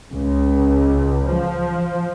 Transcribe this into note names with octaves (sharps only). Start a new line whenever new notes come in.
C#2
F3